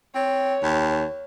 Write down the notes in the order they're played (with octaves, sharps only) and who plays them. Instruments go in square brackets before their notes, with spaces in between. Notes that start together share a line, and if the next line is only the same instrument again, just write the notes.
[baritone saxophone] C4 [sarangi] C#5
[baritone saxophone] D#2